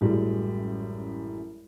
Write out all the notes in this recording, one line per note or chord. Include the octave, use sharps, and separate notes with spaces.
A1 F#2 A2 G3 G#3